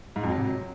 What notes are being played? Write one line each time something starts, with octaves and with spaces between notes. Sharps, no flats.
G#2
F2
F#3
C3
F#3